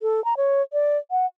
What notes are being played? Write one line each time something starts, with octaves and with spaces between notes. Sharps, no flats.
A4
A#5
C#5
D5
F#5